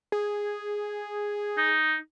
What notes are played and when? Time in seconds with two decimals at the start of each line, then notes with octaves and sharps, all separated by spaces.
0.12 G#4
1.58 D#4